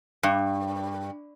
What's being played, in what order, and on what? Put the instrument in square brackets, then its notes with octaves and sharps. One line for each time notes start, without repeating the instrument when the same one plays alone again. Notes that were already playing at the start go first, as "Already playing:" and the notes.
[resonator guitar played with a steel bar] G2